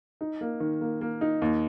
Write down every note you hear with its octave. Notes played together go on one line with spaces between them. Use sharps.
D#4
A#3
D#3
A#3
A#3
D#4
D#2